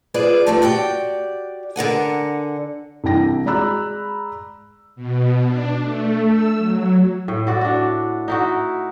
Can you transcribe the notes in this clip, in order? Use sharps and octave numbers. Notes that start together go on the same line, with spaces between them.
F4 G#4 B4 C5 D5
D#3 F3 A3 C4 G4
F#4 G4 D5 G5
D3 A#4 F#5 G#5
C2 E3 D4 G5 A#6
G#3 D5 A#5 B5 E6 F#6
B2
D4
A3
E6
F#3
A2
E4 F#4 D5
D4 F#4
D#4 E4 F#4